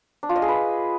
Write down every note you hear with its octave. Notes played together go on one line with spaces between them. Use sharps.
D4
F4
D#5
G#4
B4